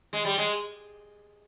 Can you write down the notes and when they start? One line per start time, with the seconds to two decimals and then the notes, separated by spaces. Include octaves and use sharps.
0.13 G#3
0.25 G3
0.38 G#3